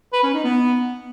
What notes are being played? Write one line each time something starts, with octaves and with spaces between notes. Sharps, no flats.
B4
C#4
D#4
B3